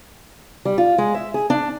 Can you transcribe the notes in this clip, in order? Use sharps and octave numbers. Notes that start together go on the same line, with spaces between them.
G3
F4
G#3
E5
G#4
D4